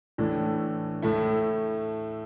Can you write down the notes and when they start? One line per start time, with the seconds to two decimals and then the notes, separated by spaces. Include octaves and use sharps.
0.18 A2 E3 A3 D4
1.02 A2 A3 E4 A4